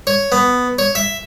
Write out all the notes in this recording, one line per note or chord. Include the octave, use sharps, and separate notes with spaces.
C#5
B3
C#5
E5